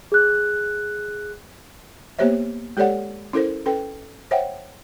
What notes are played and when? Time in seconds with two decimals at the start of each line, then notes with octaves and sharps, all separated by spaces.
0.12 G#4 F#6
2.19 A#3 B3 G4 C5 C#5 E5
2.77 G#3 G4 A4 C#5 D5 F#5
3.33 C#4 E4 A4 A#4 C5
3.66 C#4 A4 B4 G5
4.31 C5 C#5 E5 F#5 G5